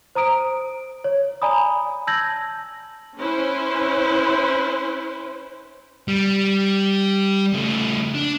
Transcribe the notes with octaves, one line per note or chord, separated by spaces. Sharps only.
C5 A#5 D#6 D7
C#5
D5 G#5 A#5 B5 D#6
A5 E6 G6 G#6 A#6 F#7
C#4 E4 B4 C5
G3
C#3 A3
D4